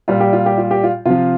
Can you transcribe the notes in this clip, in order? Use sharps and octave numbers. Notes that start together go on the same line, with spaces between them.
A#2 G3 F4
G4
F4
G4
F4
G4
F4
C3 F3 F4